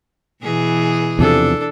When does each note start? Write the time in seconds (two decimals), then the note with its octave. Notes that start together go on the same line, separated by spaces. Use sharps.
0.44 B2 E3 G#4
1.19 E2 C3 F3 D4 A4